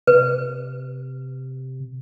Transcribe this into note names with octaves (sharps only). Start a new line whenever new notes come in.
C3 B4